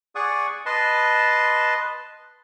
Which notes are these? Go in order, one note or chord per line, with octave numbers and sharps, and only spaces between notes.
G#4 D5 F#5 C#6 D#6
B4 D#5 A5 C6